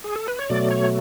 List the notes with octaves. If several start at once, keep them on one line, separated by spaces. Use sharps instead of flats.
G#4
A4
B4
C#5
B2 F#3 A3 D5
C#5